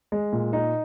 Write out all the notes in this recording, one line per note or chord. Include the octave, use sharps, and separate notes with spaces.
G#3
A#2
D#4